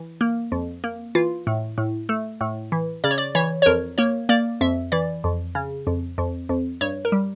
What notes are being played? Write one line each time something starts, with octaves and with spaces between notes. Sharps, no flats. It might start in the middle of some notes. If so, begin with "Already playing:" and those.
Already playing: E3
A#3
F2
A#3
E3 F4
A2
A2
A3
A2
E3
C#3 D5
C#5
D5
E3 C#5
C#5
F2 A#4
A#3 C#5
A#3 D5
F2 E5
E3 D5
F2
C#3
F2
F2
F2
G2 C#5
A#4
G3